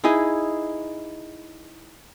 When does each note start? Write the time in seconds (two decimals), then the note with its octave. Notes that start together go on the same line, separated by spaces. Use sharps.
0.04 D#4 E4 G#4 D#5